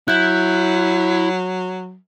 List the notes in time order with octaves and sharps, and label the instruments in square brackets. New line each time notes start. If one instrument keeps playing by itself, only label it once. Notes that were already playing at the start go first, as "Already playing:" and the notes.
[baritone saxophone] F#3 [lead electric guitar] E4 [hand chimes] F#6 G6